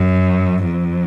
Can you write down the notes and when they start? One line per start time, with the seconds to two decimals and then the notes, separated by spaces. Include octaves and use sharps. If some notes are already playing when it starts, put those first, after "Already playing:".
Already playing: F#2
0.65 F2